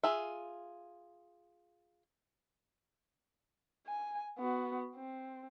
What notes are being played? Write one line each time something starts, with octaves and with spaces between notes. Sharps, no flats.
F4 G#4 E5
G#5
B3 F#4
C4